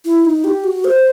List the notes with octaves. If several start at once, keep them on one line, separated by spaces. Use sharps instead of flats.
E4
D#4
G4
F#4
C5